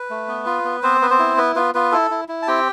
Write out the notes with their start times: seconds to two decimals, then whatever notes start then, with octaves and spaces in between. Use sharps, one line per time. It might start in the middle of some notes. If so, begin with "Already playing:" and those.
Already playing: B4
0.10 A3
0.28 B3
0.46 F4
0.65 B3
0.83 B3 C4 C5
1.01 B3 B4
1.10 C4 C5
1.19 E4
1.37 B3 B4
1.56 B3 F4 B4
1.74 B3 F4 B4
1.92 E4 A4
2.11 E4
2.28 E4
2.42 A5
2.48 C4 G4 G5